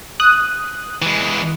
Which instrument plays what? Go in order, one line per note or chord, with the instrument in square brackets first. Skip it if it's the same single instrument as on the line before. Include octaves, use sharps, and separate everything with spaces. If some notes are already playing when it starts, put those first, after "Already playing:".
[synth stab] D#6 F#6
[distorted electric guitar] E3 G#3